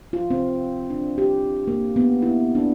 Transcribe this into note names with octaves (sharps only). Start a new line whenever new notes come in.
F4
C4
D4
G4
A#3
B3
E4
D4